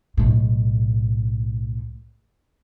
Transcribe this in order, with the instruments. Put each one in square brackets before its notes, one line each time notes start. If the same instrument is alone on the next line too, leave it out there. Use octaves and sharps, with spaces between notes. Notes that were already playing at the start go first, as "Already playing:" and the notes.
[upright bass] B1 A2